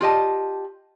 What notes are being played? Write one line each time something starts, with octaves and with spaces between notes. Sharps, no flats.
F4 G4 D#5 A5